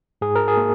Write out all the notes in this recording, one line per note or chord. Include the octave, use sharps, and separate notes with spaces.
G#2 G#4
A#4
G#4
A#3